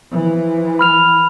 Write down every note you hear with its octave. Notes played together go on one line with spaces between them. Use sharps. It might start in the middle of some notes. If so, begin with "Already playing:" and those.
E3 F3
B5 F6 F7